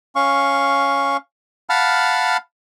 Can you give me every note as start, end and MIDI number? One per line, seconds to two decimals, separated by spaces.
0.16 1.17 61
0.16 1.17 77
0.16 1.17 85
1.69 2.37 77
1.69 2.37 78
1.69 2.37 81
1.69 2.37 83
1.69 2.37 89